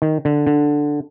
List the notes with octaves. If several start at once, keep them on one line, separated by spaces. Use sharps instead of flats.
D#3
D3
D3